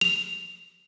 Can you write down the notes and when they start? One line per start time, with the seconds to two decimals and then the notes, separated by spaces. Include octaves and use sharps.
0.01 F7